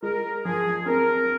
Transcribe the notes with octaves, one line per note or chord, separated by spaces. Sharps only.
G#3 A#4
F3 G#4
C4 A#4